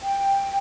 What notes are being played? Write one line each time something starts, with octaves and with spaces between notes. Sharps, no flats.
G5